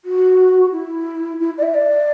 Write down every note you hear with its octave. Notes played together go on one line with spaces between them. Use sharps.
F#4
E4
E4
D5
E5
D5